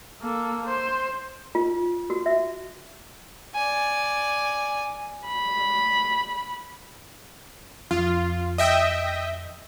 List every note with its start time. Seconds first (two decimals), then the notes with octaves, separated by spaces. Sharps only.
0.22 A#3 A4
0.66 C5
1.55 F4
2.10 F#4
2.26 E5
3.54 D5 G#5
5.27 B5
7.91 F2 F4
8.58 D#5 E5 G5